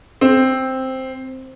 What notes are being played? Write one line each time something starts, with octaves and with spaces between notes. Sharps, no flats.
C4